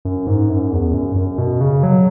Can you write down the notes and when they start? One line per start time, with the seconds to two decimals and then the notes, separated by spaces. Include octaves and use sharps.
0.05 F#2
0.27 G#2
0.50 F#2
0.72 E2
0.94 F#2
1.16 F#2
1.38 B2
1.61 C#3
1.83 F#3